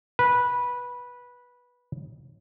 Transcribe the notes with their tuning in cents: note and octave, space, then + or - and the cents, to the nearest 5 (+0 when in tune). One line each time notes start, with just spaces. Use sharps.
B4 -15